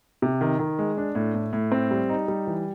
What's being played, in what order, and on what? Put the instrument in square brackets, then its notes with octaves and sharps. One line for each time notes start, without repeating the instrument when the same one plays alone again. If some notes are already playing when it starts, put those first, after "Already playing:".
[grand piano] C3
D#3
D#3
G#3
D4
A2
A2
A2
C4
G3
D#4
G3
E3